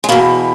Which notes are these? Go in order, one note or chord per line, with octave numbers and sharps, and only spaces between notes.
G#3
E2 B2 A#3